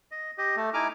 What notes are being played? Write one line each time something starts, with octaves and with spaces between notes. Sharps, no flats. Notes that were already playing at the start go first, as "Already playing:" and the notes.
D#5
G4 D#5
A3
D#4 E4 G#5 D6 F6